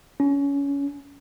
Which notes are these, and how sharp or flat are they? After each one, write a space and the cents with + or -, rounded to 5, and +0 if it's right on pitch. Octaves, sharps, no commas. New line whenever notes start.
C#4 +20